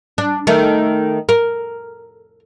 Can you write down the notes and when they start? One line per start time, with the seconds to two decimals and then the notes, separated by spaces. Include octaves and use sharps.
0.18 D4
0.47 D#3 A3
1.29 A#4